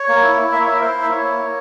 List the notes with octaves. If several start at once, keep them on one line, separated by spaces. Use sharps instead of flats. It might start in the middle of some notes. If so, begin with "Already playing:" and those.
Already playing: C#5
A#3
E4
E4
A#3 E5
C#5
E4 E5
A#4
E4 C5
A#3
E5
E4 C#5
A#3
A#3